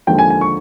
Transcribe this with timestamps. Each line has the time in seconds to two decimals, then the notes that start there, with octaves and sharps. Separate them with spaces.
0.07 D#2 D3 F3 G#3 G5
0.19 G#5
0.30 G#5
0.41 C#6